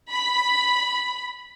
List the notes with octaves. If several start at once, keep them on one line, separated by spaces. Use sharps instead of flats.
B5